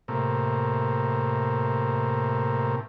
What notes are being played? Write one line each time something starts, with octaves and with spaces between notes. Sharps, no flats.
A2 C3 A#3